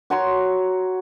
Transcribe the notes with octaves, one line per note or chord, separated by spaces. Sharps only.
F#4 C#5 A#5 C6